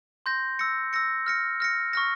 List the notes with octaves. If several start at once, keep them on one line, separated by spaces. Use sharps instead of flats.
C6 G6 A#6
E6 A#6 C#7
E6 A#6 C#7
F6 A#6 C#7
F6 A#6 C#7
C#6 F6 A#6